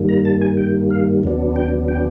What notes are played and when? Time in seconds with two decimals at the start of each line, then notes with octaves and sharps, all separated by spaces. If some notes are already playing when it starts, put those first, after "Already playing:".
Already playing: G2 D#3 G3 A#3
0.09 A#5
0.25 A5
0.41 G#5
0.57 G5
0.90 F5
1.23 D#2 C#3 F#3 B3 D4
1.56 G5
1.88 G5